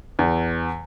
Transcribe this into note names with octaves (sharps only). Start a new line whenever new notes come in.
E2